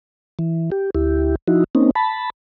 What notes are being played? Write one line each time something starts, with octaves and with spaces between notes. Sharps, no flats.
E3
G4
D2 E4 G4
F3 D#4 E4 F#4
A#3 C4 C#4 D#4
A5 B5